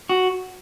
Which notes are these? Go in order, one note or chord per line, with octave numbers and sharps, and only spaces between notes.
F#4